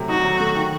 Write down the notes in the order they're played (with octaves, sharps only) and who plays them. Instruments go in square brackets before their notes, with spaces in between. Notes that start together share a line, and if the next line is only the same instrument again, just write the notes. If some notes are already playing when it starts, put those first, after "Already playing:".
Already playing: [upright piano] C3 F#3 A3
[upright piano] D#4 [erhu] F#4
[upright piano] F#3
A3
D#3